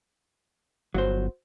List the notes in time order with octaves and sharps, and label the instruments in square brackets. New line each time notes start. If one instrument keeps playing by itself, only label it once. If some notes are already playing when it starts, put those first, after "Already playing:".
[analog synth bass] G1 [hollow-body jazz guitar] F#3 F#4 C5